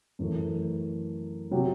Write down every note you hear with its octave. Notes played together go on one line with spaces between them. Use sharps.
F#2 E3 A3
C3 F#3